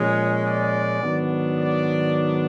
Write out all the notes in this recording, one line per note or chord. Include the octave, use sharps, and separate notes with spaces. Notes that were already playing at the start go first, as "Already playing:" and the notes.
Already playing: A#2 F3 G#3 C#4 C#5
D5
G#2 D#3 F#3 B3 D4
D5